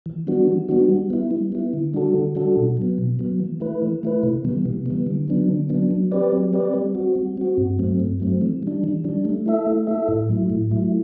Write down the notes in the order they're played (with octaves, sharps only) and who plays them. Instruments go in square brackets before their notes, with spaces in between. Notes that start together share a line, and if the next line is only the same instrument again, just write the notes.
[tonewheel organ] E3
G3 B3 D4 F#4
E3
G3 B3 D4 F#4
G3
B3 E4
G3
B3 E4
D3
G3 D4 F#4 A4
D3
G3 D4 F#4 A4
B2
F#3 B3
B2
F#3 B3
E3
A3 E4 B4
E3
A3 E4 B4
C3
E3 G3 B3
C3
E3 G3 B3
D3
F#3 B3 D4
D3
F#3 B3 D4
F#3
C4 G4 B4 D5
F#3
C4 G4 B4 D5
G3
C4 F#4
G3
C4 F#4
G2
F#3 A3 C4
G2
F#3 A3 C4
E3
G3 D4
E3
G3 D4
A3
E4 A4 E5
A3
E4 A4 E5
A2
F#3 A3 E4
A2
F#3 A3 E4